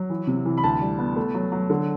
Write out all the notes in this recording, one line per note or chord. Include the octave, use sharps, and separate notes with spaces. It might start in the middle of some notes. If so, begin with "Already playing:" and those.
Already playing: F#3
E3
C3
E3
B5
D2 A5
G3
B3
A3
F#3
F#3
D3